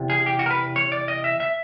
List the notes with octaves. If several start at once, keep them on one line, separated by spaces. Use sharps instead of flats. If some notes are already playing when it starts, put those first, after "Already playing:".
Already playing: E2 C3
G#4
G4
F#4
A#4
B4
C#5
D5
D#5
E5
E5